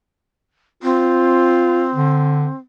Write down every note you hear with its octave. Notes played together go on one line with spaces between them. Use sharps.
C4 F4
D3